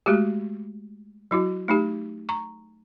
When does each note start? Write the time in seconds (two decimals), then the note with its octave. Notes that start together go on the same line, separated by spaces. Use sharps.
0.06 G#3 A3 F#4 G4
1.31 F#3 E4 F#4
1.68 A3 D#4 G4
2.29 A#5 C#6